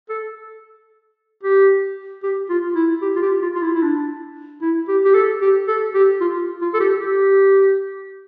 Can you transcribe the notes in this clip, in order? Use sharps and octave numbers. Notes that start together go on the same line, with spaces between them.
A4
G4
G4
F4
E4
G4
F4
G4
F4
F4
E4
E4
D4
E4
G4
G4
A4
G4
A4
G4
F4
F4
A4
G4
G4